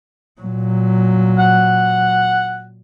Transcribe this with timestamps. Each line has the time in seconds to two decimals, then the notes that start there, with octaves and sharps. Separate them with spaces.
0.41 A#2 F#3
1.39 F#5